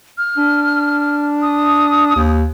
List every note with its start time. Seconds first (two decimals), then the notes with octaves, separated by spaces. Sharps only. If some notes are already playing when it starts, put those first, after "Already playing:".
0.18 F6
0.38 D4
1.42 D#6
2.16 D#2